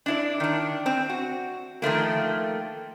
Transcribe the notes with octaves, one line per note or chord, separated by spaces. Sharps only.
D4 E4 D5
D#3 D4
C4
F#4
D#3 F3 A3 A#3